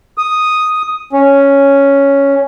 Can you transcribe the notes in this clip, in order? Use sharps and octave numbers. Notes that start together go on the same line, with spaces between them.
D#6
C#4